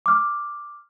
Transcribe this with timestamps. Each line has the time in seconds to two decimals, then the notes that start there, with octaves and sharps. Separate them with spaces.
0.06 D6 F6